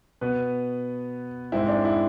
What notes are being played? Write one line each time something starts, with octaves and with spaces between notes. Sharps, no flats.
B2 B3 B4
G#2 G#3 C4 E4
D4
E4